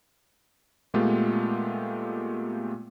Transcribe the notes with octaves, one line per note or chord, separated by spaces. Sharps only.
A#2 G#3 A3 B3 F4 G4